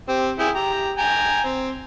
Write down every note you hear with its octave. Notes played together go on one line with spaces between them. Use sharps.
C4 G4
E4 G#4 G5
G4 A#5
G5 G#5 A#5
C4